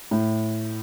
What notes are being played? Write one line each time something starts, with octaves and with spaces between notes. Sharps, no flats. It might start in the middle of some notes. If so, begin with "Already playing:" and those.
A2